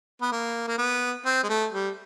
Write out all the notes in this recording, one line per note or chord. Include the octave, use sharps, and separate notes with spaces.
B3
A#3
A#3
B3
C4
G#3
A3
G3